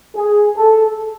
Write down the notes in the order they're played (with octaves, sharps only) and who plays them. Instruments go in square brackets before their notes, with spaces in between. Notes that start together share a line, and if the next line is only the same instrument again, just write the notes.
[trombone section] G#4
A4